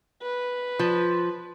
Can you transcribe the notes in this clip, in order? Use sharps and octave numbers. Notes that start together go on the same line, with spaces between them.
B4
F3